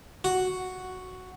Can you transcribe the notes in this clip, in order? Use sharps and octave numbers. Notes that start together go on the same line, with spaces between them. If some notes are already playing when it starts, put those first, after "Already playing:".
F#4